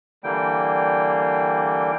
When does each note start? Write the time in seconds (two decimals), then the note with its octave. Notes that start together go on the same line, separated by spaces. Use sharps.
0.24 D3 E3 G3 A#3 G5